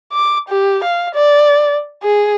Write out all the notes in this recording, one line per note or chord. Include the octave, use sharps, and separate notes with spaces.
D6
G4
F5
D5
G#4